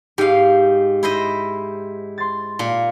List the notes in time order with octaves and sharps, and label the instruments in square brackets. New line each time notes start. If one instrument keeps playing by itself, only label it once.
[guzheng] G#2 F5 [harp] G4 C7
[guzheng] E4 C5 D#5
[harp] C6 A6
[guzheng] A#2